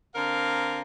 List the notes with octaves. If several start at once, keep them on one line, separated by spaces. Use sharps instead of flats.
D3 C4 A#4 F5 A#5